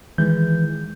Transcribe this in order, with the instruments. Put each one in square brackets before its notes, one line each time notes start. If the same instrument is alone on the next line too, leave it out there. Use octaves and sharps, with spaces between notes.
[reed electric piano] D#3 G#3 G6 [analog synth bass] E3